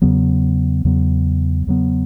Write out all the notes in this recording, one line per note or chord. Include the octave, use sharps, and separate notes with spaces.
E2 C#3 F#3 B3
E2 C#3 F#3 B3
E2 C#3 F#3 B3